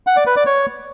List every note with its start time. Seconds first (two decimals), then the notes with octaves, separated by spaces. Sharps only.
0.07 F#5
0.17 D5
0.26 B4
0.36 D5
0.46 C#5